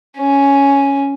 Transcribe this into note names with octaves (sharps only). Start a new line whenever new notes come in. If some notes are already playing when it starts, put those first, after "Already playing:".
C#4